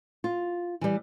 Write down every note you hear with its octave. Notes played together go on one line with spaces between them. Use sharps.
F4
E3 G3